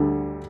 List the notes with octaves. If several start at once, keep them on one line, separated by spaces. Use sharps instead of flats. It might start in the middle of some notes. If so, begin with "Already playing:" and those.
Already playing: D2 D3 G3